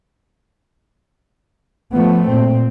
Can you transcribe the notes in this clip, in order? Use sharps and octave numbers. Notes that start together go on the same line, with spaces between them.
F3 A3 B3
A#2 C4